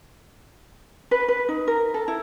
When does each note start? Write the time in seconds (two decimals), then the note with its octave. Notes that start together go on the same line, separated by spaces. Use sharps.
1.11 B4
1.28 B4
1.49 D#4
1.68 A#4
1.94 A4
2.08 E4